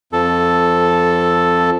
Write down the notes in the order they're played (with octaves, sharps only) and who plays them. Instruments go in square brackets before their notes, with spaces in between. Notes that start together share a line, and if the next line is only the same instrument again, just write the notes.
[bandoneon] F2 A4